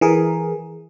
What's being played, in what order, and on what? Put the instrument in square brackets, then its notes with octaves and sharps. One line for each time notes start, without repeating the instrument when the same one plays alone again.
[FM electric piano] E3 G#4 A#4